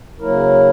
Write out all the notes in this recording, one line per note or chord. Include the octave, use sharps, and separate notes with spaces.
C#3 F#3 A#3 E4 A#4